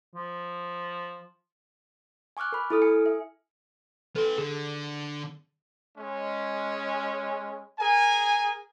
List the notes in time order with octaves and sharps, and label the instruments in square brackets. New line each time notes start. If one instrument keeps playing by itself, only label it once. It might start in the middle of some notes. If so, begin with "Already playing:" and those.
[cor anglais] F3
[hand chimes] G#5 C#6 D6 F6 F#6
A#4 B5
E4 A4 D#6 F6
G#5 C#7
E5
[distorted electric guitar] B3 C6 [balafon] A4
[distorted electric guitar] D3 [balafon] G#4
[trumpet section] G#3 C#4
G#4 A#4 G#5